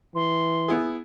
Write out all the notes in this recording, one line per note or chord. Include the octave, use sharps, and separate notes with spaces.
E3 C6
B3 E4 G#4